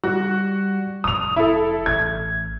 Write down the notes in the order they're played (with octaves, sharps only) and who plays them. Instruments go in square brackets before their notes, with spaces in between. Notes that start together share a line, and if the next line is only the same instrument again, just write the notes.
[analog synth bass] G3 [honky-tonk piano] F#4
[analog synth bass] F1 [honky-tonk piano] D#6 F7
[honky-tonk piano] E4 A4
[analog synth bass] A1 [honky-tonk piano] G#6